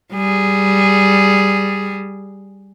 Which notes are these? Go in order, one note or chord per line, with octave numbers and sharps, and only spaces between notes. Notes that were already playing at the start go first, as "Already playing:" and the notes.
G3 G#4